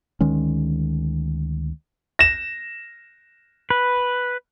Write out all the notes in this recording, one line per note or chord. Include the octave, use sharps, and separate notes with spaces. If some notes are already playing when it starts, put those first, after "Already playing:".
D2 D#3 G#3 C#4
A#6 E7
B4